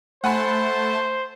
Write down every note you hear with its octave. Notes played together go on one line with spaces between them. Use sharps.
A3 C5 F#5 G#5 A5 B5